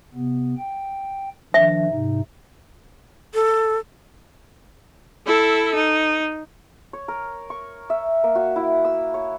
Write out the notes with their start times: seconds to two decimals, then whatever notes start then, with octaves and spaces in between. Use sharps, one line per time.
0.14 C3 B3
0.57 G5
1.54 D#3 F3 D4 E5
1.90 G#2 C3 D#4
3.34 A4
5.26 E4 A4
5.74 D#4
6.93 C#5
7.08 A#4
7.50 C#6
7.90 E5
8.23 A#3
8.35 F#4
8.56 E4
8.85 E6
9.14 C#5